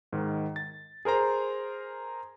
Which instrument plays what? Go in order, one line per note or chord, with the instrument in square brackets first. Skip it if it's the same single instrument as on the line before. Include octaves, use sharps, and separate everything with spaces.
[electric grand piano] G#2 D#3
A6
G#4 A#4 C5 A#5